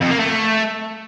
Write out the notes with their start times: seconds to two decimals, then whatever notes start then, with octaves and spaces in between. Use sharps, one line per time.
0.01 F2
0.10 A#3
0.19 A3